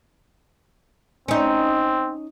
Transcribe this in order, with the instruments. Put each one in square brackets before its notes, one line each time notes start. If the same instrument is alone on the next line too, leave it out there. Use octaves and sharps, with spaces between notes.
[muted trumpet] C4 [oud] C#4 D#4